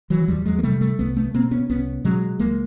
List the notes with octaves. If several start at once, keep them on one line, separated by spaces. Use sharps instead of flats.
E3 F#3
E2 F3 G3
F#3 G#3
A#3
C3 G3 A3
G3 A3
C2 A3 B3
A3 B3
B2 A#3 C4
B3 C#4
C2 B3 C#4
B2 F#3 G#3
C#2 G#3 A#3